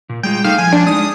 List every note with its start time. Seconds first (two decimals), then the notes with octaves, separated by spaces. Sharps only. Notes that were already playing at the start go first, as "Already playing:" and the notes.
0.09 A#2
0.23 G3 G#3 F4 G5
0.44 A3 D#4 A4 F5
0.58 F3 G#5
0.72 D4
0.87 G#3 D#4 D#6